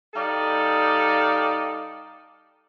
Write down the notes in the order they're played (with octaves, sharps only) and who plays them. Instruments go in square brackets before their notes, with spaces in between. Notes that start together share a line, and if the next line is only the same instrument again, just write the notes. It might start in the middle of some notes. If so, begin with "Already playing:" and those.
[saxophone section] G3 D#4 A4 D5 D#5 F5